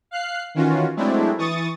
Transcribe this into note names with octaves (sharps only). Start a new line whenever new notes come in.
F5 F#6 C7
D#3 E3 C#4 F4 F#4
F#3 G#3 A3 C4 D4 E4
E3 C#6 D#6 A6